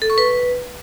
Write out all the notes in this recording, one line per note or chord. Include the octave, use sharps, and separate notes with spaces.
A4
C#6
B4